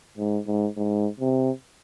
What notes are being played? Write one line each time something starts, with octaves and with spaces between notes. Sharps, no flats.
G#2
G#2
G#2
C3